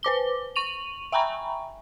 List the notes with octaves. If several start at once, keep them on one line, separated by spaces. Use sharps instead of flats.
B4 C5 D6 G7
C#6 D#7 F7 F#7
E5 G5 G#5 A#5 B5 C#6